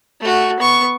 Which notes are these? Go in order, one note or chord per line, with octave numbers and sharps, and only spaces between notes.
A3 F#4
B3 C#6